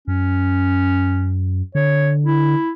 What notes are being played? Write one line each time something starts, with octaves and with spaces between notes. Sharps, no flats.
F#2 C#4
D3 C#5
E4